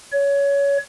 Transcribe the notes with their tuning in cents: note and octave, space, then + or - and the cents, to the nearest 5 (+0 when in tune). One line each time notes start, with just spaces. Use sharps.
C#5 +20